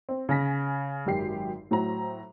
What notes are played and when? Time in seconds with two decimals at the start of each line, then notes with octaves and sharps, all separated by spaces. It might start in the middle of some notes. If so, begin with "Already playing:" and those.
0.09 C4
0.29 C#3 G#5 A#6 B6
1.06 G#1 F#2 G4 C7
1.71 A2 F#3 C5 A#5